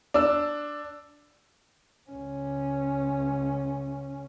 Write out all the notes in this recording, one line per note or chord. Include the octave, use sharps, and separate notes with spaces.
D4 E6
C#2 C#4